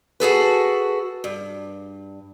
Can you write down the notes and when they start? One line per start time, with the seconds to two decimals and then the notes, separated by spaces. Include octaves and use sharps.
0.20 F#4 G#4 A4 B4
1.24 G2